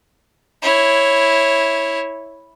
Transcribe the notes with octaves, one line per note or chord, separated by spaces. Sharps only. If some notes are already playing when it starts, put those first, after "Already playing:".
E4 C#5